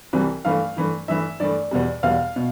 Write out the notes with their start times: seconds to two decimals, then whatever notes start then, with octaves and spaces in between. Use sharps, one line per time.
0.13 C2 C3 E3 G3
0.45 G2 E3 A3 F5
0.77 G2 E3 A3
1.08 G2 E3 A3 E5
1.40 G2 E3 A3 D5
1.71 E2 B2 G3
2.03 E2 B2 G3 F5
2.36 B2